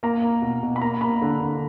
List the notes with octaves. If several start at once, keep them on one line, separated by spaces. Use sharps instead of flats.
A#3 A#5
A#3
B2
B2
B5
A#3 A#5
A#3 B5
D3
D3